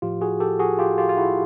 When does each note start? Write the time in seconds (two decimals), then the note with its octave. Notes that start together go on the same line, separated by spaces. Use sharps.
0.02 A2 F3 F4 G4
0.21 F#4 G#4
0.40 G4 A4
0.59 F#4 G#4
0.78 F4 G4
0.98 F4 G4
1.09 F4
1.17 E4 F#4